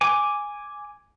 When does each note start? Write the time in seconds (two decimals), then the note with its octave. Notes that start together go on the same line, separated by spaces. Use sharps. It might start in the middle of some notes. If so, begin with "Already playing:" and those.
0.01 G#5 D6